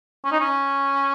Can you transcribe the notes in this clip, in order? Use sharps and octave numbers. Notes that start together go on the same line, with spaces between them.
C#4
D#4
C#4